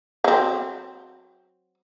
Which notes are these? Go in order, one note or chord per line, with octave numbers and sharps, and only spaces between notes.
F#3 C4